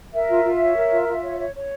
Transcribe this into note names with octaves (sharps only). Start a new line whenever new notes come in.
A#4 E5
F4
F4
C#5
A#4
F4
F4
C#5
C#5
C#5